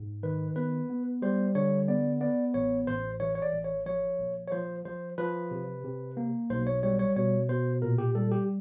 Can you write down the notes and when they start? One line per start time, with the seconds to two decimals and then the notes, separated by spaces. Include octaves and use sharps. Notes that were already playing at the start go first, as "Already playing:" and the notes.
Already playing: G#2
0.23 D#3 B4
0.56 B3 B4
0.89 B3
1.22 G3 C5
1.55 D3 C#5
1.88 B3 D5
2.21 B3 D5
2.54 A1 C#5
2.87 A1 C5
3.20 E3 C#5
3.35 C#5
3.42 D5
3.53 A1
3.64 C#5
3.86 F3 C#5
4.19 A#1
4.48 C#5
4.52 F3 C5
4.85 F3 C5
5.18 F3 B4
5.51 C3
5.84 C3
6.17 A#3
6.50 B1 C5
6.67 C#5
6.83 G3 C#5
6.99 C#5
7.16 B2 C#5
7.49 B2 C5
7.82 A#2 A#4
7.98 G4
8.15 G3 A4
8.31 G4